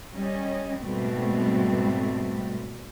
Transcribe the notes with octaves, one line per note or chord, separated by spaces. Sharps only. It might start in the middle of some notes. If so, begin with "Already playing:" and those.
G3 C#4 D#5
G#2 B2 G3 A3 C4